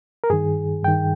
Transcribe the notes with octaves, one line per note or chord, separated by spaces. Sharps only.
A#4
G2 D#3 G#4
G2 D#3 G5